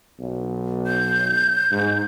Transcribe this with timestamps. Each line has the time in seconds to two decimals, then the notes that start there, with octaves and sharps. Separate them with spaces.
0.20 B1
0.87 G6
1.72 G#2